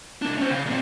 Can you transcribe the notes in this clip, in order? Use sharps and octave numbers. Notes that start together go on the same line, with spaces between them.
C2 D4
C#4 C5
C#3
A#2 C4